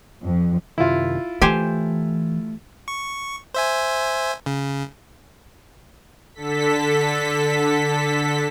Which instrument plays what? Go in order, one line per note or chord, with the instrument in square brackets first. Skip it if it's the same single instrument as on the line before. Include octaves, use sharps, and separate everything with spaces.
[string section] F2
[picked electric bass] F#2 C3 D#3 [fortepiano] E4 F4
[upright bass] E3 [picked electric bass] A3 [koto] G4 C5 G#5
[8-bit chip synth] C#6
C5 E5 G#5
C#3
[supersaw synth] D3 A4 B6